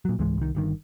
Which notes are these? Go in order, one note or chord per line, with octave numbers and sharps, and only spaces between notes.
A#2 F#3
C#2 G#2 E3 G#3
C2 D#3
G1 G2 D#3